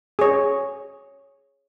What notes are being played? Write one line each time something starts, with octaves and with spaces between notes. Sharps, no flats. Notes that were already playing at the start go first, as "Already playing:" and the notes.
G#4 C#5